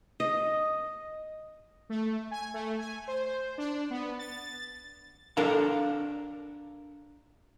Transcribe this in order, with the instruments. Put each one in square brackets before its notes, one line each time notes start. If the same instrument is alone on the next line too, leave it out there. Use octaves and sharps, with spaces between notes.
[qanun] D#5
[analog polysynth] A3
G#5
A3
G#5
C5
D4
B3
A6
[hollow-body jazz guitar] D4 A4 A#4 F5 A5 A#5